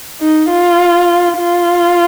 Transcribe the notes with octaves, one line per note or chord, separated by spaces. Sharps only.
D#4
F4
F4